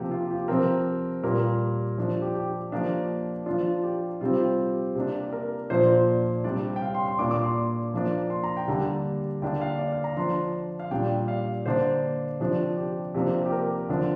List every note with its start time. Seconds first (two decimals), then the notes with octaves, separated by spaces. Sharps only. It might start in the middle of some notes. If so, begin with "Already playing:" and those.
Already playing: C3 F3 A#3 G4
0.11 F4
0.31 G4
0.48 C3 F3 C4 A#4
1.23 A#2 G3 A#3 A#4
1.98 F3 D4
2.22 G4
2.35 G4
2.72 F3 A#3 D4
3.46 F3 D4 F4
3.83 G4
4.21 C3 G3 C4 F4
4.58 G4
4.95 C3 A#3 D4
5.33 A#4
5.70 A#2 F3 A#3 D4 C5
6.44 C3 G3 D4 D5
6.76 G5
6.82 F5
6.94 C6
7.06 C6
7.19 A#2 A#3 D4 D6
7.31 D6
7.43 C6
7.94 F3 A#3 D4
8.30 C6
8.44 A#5
8.57 G5
8.68 D3 G3 A#3 D4 A#5
9.42 D3 A#3 D4 G5
9.61 F5
9.79 D5
9.92 F5
10.04 A#5
10.16 F3 D4 C6
10.80 F5
10.91 A#2 G3 A#3 D4 G5
11.28 F5
11.66 D3 A#3 D4 C5
12.40 C3 F3 D4
12.77 G4
13.14 C3 F3 A#3 D4
13.45 G4
13.52 A#4
13.89 D3 F3 D4